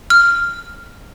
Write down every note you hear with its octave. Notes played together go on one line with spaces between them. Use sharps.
F6